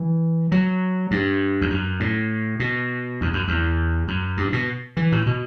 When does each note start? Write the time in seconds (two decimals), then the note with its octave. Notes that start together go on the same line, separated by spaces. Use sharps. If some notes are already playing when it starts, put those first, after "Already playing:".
Already playing: E3
0.52 F#3
1.11 G2
1.61 E2
1.70 F#2
2.00 A2
2.60 B2
3.21 E2
3.33 F#2
3.48 E2
4.08 F#2
4.37 G2
4.53 B2
4.97 E3
5.12 A2
5.26 B2